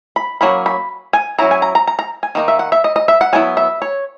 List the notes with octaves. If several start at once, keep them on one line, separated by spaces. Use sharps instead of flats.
B5
F#3 A#3 C#4 B5
B5
G#5
F#3 C#4 E4 A#5
G#5
A#5
A#5
A#5
A#5
G#5
D#3 A#3 D#4
E5
F#5
E5
D#5
D#5
E5
F#5
F#3 B3 E4 G#5
E5
C#5